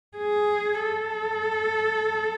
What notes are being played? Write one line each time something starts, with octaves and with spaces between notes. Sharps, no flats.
G#4
A4